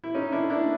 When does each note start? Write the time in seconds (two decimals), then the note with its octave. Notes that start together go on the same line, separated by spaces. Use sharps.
0.04 E4
0.15 C#4 D#4
0.32 D4 E4
0.50 D4 E4